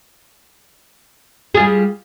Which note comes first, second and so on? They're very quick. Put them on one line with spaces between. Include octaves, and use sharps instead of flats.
G#4 F4 G3